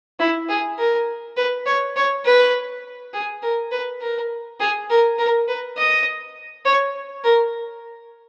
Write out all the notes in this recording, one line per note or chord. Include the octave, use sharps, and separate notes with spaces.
E4
G#4
A#4
B4
C#5
C#5
B4
G#4
A#4
B4
A#4
G#4
A#4
A#4
B4
D#5
C#5
A#4